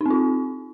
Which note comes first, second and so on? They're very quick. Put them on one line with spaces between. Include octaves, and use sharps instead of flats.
D#4 C4 F4